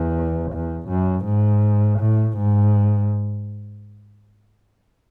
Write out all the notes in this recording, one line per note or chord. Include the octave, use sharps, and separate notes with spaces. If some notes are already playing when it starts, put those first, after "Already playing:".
Already playing: E2
E2
F#2
G#2
A2
G#2